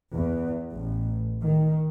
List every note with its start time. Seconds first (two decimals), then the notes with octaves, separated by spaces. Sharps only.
0.13 E2
0.71 A1
1.41 D#3